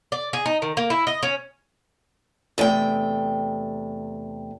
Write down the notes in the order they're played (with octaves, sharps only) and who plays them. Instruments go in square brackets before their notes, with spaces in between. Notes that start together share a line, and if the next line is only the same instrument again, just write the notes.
[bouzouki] D5
G#4
D#4
D#3
A#3
E4
D#5
C#4
[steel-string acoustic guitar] E2 C3 A3 G5